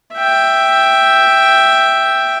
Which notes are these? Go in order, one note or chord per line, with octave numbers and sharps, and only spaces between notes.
E5 G5